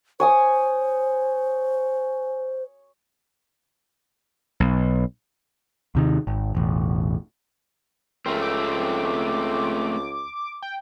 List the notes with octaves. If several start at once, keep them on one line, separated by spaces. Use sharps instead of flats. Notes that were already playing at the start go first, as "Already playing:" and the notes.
C5 C#5 G#5 D#6
B1
D#2 C3 D#3
G#1
E1 A1
C#2 A3 C4 A#4
D6
G5